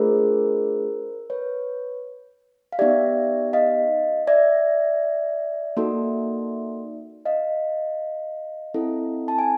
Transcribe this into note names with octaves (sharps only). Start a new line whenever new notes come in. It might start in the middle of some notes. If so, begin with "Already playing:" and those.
Already playing: A3 D4 F4 G#4 A#4 C5
B4 C#5
F5
B3 D#4 G4 D5 E5
D#5 F5
D5 E5
A#3 D#4 F#4 A4
D#5 F5
C4 E4 A4
A5
G#5